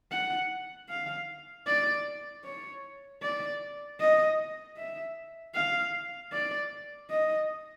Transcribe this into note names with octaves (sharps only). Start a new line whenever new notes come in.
F#5
F5
D5
C#5
D5
D#5
E5
F5
D5
D#5